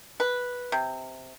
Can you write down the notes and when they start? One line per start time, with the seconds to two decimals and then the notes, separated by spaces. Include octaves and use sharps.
0.20 B4
0.72 C3